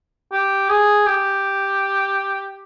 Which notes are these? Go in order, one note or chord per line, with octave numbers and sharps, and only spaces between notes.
G4
G#4
G4